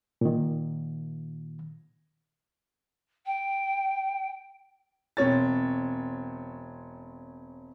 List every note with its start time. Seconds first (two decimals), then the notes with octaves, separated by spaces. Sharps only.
0.21 A#2 D#3
3.25 G5
5.17 E1 C4 C#5 A6